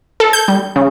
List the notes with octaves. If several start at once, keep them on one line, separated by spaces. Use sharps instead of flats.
A4
G6
G3
C#3